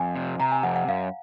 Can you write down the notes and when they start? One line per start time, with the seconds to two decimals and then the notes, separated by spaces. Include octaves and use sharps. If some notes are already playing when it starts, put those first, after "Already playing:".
Already playing: F2 G#5
0.15 C3
0.40 C3 A#5
0.52 G#5
0.63 F2 F#5
0.76 F#5
0.88 F#2 F5